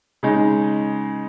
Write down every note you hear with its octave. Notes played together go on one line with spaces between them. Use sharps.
C#3 G#3 D#4